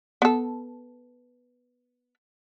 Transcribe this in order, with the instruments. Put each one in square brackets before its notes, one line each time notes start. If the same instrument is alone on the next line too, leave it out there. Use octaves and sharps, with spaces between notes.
[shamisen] B3 A4